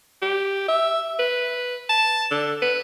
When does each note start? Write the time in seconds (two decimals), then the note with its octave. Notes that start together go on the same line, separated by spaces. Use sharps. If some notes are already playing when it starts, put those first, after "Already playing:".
0.22 G4
0.68 E5
1.19 B4
1.89 A5
2.31 D3
2.62 B4